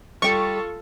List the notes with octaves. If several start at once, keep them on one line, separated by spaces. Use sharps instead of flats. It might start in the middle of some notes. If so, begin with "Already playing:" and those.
G3 F4 A4 G5 C#6